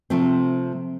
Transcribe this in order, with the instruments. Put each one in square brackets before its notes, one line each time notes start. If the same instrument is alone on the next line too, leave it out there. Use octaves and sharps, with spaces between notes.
[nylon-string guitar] C3 F3 A3 C4